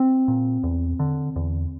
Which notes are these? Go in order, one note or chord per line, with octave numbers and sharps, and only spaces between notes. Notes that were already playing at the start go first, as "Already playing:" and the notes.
Already playing: C4
A#2
E2
D3
E2